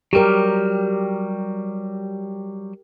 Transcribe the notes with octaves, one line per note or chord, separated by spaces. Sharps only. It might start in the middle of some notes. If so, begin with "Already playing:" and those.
F#3 G3 G4 A#4